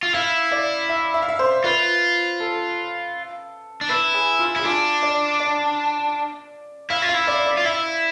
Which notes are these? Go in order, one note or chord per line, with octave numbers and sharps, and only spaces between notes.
F4
E4 F5
D5
E5
E5
F5
E5
C5
F4 B4
A4
D4
E4 B4
G#4
F4
E4 G#4
D4 F4
D5
D5
E4 F5
F4
F5
E4
D5
D5
F4
E4 E5